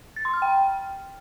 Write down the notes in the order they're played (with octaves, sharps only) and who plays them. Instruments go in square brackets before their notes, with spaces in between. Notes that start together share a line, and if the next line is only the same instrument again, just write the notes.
[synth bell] A6
C6
F6
G5